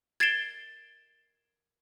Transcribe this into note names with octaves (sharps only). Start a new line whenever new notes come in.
G#6 A6 C7 D7 E7 G7